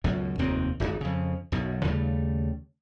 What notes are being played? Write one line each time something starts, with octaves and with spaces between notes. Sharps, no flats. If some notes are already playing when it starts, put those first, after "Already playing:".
C#2 F#2 B2
F1 D#2 D#3 C4
D1 G#1 C#2
F2 C#3
B1 F#2 B2
D#2 C#3 G3 A3